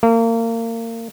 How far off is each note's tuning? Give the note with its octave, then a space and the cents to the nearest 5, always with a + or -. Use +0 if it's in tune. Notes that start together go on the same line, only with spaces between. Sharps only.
A#3 -30